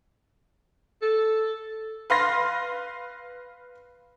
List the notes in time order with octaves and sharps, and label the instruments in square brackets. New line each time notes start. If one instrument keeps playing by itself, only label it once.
[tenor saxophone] A4
[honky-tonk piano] B4 F5 C6 A#6